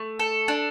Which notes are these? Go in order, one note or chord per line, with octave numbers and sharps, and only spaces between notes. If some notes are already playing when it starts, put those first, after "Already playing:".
Already playing: A3
A4
D4